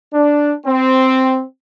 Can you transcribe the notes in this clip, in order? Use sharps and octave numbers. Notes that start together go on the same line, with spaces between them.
D4
C4